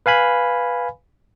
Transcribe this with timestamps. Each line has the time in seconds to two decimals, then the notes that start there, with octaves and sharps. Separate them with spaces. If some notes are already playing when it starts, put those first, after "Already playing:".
0.06 B4 F5 G#5 B5